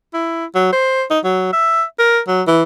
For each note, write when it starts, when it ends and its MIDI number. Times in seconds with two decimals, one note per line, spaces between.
0.14 0.45 64
0.55 0.72 54
0.72 1.03 72
1.10 1.19 63
1.24 1.49 54
1.53 1.83 76
1.99 2.19 70
2.28 2.42 54
2.47 2.63 52